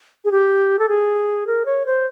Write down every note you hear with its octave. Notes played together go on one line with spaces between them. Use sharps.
G#4
G4
A4
G#4
A#4
C#5
C5